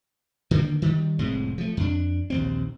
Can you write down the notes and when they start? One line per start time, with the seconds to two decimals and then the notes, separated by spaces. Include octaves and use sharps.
0.51 D3 D#3 A#3
0.82 D#3 G3
1.19 F1 A2 G#3 C4
1.58 F3 A3
1.77 F2 D4
2.30 A#1 D#2 C4